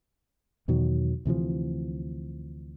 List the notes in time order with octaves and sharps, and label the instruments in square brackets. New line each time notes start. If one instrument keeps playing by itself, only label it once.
[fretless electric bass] E2 B2 D#3 F#3
D2 C3 E3 F3